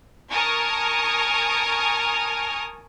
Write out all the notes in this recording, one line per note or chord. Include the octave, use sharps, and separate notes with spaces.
A#4 G#5 A5 C#6 D#6 F6